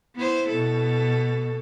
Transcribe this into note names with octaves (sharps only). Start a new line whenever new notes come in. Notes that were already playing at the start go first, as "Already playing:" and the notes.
B3 E4 C5
B2 A4